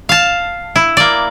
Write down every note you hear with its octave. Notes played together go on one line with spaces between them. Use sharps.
F5 A5
E4
A#3 D5